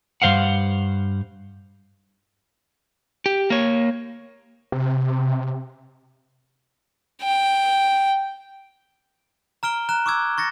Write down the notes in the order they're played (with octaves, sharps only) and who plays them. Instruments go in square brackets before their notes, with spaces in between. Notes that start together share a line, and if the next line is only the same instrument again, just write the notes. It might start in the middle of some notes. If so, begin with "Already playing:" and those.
[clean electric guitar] G2 C#3 C5 F5 F#5
[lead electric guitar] G4
A#3 C#5
[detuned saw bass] C3
[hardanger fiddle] G5
[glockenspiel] A#5 F6 D7 G7
A#5 F#6 E7
C#6 D6 E6 G#6
C#6 A6 A#6 C#7